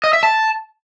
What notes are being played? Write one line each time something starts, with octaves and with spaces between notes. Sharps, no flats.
D#5
E5
A5